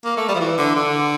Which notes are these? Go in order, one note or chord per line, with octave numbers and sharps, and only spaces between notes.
A#3
A3
G3
F3
E3
D3
D3